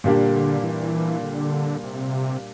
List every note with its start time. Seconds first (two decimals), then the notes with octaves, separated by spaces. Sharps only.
0.04 A#2 D3 G3 A#3 D4 G4
0.64 E3
1.23 D3
1.83 C3